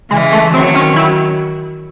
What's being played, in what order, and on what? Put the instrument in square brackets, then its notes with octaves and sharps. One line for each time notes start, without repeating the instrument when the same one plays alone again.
[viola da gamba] C#3 E3 [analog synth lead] G#3
[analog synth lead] A3
[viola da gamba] D#3 F#3 [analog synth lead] C4
[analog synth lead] C#4
E4